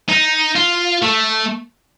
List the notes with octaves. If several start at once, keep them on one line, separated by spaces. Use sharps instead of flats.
D#4
F4
A3